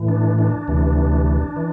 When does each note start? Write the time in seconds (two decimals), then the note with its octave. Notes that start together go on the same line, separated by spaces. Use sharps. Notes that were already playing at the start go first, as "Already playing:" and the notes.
Already playing: A2 E3
0.08 D4
0.39 D4
0.68 D2 C3 E3
1.56 E3